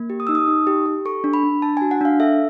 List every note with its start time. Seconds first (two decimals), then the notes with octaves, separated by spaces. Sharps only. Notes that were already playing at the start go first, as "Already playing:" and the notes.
Already playing: A#3
0.10 G4
0.20 D#6
0.27 D#4 E6
0.35 D#6
0.48 D#4
0.67 G4
0.86 G4
1.05 A4 C#6
1.24 D4
1.33 B5
1.43 D4
1.62 D4 A5
1.77 F#4 G#5
1.91 F#5
2.01 D4 F5
2.20 A4 E5